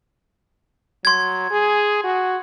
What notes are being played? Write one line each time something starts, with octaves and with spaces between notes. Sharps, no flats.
F#3 C6 G#6
G#4
F#4